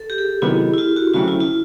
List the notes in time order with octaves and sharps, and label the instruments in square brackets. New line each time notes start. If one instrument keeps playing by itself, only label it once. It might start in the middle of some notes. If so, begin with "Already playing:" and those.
Already playing: [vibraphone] A4
G4
G#4
[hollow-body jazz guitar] C3 D#3 F#3 B3 [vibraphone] E4
[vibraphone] E4
F4
F#4
[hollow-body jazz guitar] D2 C#3 F#3 A3 C4 [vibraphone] F4
[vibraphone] E4
F4